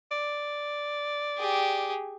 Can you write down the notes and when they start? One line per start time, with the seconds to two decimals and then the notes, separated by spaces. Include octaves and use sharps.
0.11 D5
1.38 G4 G#4